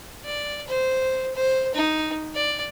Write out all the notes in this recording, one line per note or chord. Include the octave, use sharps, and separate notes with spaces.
D5
C5
C5
D#4
D5